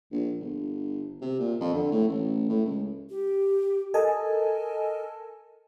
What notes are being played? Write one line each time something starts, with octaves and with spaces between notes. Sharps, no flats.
A#1
G1
C3
A#2
F2
D3
A2
A1
A2
C#2
G4
A4 A#4 D#5 G#5 A5